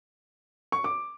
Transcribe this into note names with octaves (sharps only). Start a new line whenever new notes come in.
C#6
D6